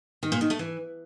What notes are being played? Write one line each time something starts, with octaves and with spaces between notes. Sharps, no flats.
D#3
A#2
D#3
A3
E3